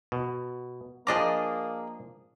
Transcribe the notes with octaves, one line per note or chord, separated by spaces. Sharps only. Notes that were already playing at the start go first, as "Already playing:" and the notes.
B2
F3 A#3 D4 G#4 D#5 A#5 D6